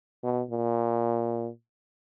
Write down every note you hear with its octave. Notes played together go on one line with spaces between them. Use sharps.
B2
A#2